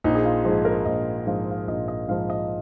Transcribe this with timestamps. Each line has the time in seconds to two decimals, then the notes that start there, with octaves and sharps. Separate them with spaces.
0.04 A#1 D#4
0.15 G#4
0.25 F4
0.45 G#2 F3 G#4
0.65 A#4
0.86 A#1 D#5
1.27 G#2 F3 F5
1.51 F5
1.68 A#1 D#5
1.88 D#5
2.08 G#2 F3 F5
2.30 D#5